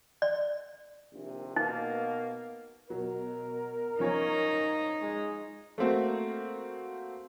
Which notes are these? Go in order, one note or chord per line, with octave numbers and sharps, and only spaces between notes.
D5
A#1 D#2 C3
B2 A#3 D#4
B2 F#3 A#4
F3 C#4 D#4 C#5
G#3
A3 A#3 C4 F#4